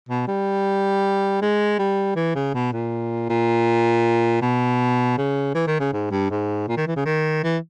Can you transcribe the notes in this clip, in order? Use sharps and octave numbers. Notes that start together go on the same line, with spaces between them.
B2
G3
G#3
G3
E3
C#3
B2
A#2
A#2
B2
C#3
E3
D#3
C#3
G#2
G2
G#2
A#2
D#3
E3
C#3
D#3
E3